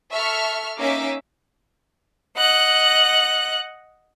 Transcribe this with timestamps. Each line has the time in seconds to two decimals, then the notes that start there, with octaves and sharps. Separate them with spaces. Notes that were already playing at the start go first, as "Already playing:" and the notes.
0.12 A4 E5 C#6 F6
0.78 A#3 C#4 D#4 E5 D6
2.36 D#5 F#5 F#6